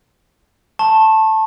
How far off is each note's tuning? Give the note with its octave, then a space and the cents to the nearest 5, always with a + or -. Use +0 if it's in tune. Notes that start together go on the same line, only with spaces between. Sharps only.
A5 +0 C#6 -40